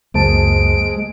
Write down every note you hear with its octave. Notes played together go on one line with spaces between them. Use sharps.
C#2 F#2 G#3 A#3 C5 A5 D7